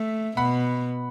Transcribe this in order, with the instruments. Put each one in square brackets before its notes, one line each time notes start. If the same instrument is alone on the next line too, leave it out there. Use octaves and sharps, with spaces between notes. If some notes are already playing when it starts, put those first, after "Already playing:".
Already playing: [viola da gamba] A3 [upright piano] E5
[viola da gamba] B2 [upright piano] F#5 B5